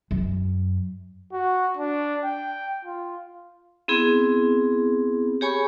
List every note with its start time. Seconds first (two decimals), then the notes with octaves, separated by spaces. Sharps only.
0.11 F#2
1.33 F#4
1.77 D4
2.24 G5
2.85 F4
3.88 B3 C4 E4 G#4
5.41 G4 G#4 C#5 G#5 B5 C#6